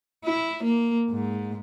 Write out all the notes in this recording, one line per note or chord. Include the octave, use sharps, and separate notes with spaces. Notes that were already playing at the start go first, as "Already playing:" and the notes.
E4
A#3
G#2